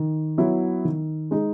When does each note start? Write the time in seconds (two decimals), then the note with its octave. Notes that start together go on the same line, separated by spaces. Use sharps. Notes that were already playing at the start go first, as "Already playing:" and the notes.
Already playing: D#3
0.38 F#3 B3 E4
0.85 D#3
1.31 G#3 D#4